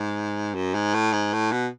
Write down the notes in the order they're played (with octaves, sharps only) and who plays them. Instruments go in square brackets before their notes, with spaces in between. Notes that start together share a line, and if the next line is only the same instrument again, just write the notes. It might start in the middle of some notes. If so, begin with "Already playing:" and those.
Already playing: [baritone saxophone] G#2
F#2
G#2
A2
G#2
A2
B2